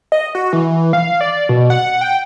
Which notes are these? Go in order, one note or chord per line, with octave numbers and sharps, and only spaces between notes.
D#5
F#4
E3
F5
D5
B2
F#5
G5